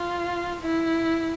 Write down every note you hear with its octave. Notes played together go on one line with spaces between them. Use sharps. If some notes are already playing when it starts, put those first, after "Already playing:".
Already playing: F4
E4